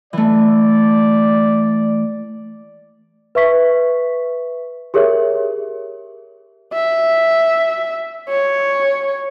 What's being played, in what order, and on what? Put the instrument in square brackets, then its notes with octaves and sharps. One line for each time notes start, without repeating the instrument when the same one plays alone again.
[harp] E3 A3 [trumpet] D5
[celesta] B4 E5 C#6 B6
G4 G#4 A#4 C#5 E5
[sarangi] E5
C#5